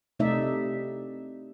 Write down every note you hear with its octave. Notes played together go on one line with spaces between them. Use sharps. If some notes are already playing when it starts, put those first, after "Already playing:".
C3 A3 D#4 D5 E5